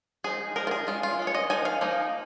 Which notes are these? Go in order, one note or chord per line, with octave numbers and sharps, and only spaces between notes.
F3 G#3 D#4 G#4
F3 G#3 D#4 A#4
F4
G#4
G#3 C#4 F4
F4
G#3 C#4
C#5
D#5
F3 A#3 D#4 G#5
F5
F3 A#3 D#4